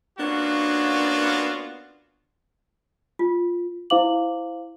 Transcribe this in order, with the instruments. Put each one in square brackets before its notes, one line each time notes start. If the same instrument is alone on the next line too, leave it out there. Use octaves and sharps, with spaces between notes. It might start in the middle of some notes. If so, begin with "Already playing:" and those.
[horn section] A#3 B3 C#4 D4 F4 F#4
[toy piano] F4
[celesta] E4 C5 F5 D6 F#7